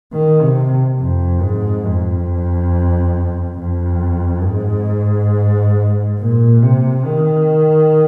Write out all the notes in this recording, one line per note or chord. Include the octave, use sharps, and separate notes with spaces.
D#3
C3
F2
G#2
F2
F2
G#2
A#2
C3
D#3